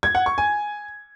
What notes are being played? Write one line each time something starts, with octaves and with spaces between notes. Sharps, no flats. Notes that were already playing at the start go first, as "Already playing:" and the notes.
G#6
F#5
C#6
G#5